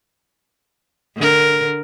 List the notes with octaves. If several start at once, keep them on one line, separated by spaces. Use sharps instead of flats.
D3 A#4